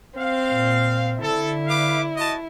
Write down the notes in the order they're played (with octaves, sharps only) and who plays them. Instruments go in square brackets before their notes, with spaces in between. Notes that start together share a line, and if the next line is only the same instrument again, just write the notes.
[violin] C4 [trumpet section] F5
[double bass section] A#2
[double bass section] D3 [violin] E4 [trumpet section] A4
[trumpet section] B4 F5 D6
F#4 D#5 A5